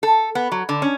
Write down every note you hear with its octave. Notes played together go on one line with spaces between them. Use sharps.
A4
B3
F#3
D3
C#4